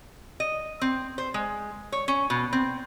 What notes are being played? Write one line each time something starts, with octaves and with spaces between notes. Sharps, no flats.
D#5
C4
C5
G#3
C#5
C#4
B2
C4